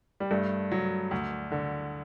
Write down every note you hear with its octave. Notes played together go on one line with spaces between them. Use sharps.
G3
G2 A3
F#3
D2
D3